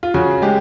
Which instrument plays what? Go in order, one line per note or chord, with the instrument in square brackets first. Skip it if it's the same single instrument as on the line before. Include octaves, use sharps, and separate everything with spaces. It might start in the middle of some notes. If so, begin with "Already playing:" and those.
[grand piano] F4
C#3 F#4
G#3 G4